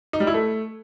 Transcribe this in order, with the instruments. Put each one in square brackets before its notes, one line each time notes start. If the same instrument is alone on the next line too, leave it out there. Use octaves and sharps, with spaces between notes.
[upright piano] D#4
G3
E4
A3